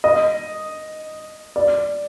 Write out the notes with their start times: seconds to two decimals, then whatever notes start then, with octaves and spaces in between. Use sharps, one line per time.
0.04 D#5
1.56 D5